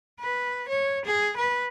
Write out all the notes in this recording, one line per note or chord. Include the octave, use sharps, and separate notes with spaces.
B4
C#5
G#4
B4